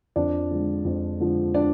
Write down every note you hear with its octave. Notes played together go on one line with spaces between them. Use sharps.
F2 D4 D5
D3 F3 G#3
F2
D3 F3 G#3
D4 D5